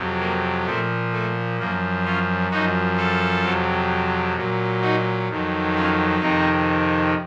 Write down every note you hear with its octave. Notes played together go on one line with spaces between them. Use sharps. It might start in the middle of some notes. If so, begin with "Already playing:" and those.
Already playing: F2 C3 F#3
A#3
A#2 F3 A3 C4
A3
F#2 F3 A#3
C#4 F4
F#2 F3 D#4 F#4
F4 A4
F2 C3 F#3
A#2 F#3
D#4 F#4
F2 D#3 F#3
C#4 F4
F2 C3 D#3 C4 D#4